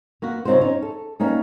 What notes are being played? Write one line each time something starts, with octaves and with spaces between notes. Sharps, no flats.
A#3 B3 F#4
C#3 G3 C4 D#4 F4 C5
C#4 D#4 C#5
A4
G3 A#3 C#4 D#4